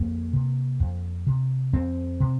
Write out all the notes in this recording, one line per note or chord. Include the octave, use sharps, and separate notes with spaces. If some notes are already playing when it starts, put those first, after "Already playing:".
Already playing: F2 A#3
C3
F2
C3
F2 C4
C3